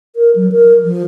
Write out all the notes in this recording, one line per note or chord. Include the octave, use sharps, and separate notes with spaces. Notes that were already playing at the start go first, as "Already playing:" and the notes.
A#4
F#3
A#4
F3